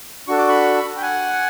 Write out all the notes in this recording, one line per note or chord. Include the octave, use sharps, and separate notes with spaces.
D4 F#4 A4 C#6
D6
B5 C#6
G5
F#5 G#5